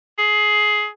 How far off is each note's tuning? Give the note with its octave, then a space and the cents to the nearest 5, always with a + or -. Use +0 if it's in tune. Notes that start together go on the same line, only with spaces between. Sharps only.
G#4 +20